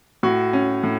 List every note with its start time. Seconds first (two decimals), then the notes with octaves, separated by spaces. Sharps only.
0.23 A2 F#4
0.53 C#4
0.83 A2